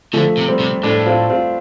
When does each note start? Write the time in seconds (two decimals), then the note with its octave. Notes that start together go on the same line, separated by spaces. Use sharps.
0.13 D3 F3 A3
0.37 C3
0.48 G3 C4
0.60 C3
0.83 A2 A3 D4
1.06 C4 F4
1.30 C4 F4